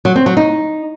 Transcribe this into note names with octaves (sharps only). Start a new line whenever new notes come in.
F#3
C4
F#3
D#4